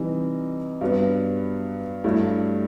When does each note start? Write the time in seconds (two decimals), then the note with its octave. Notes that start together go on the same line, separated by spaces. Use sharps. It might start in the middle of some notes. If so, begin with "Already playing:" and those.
Already playing: C3 E3 G3 D#4
0.81 G2 F#3 B3
2.04 G2 F#3 A3 E4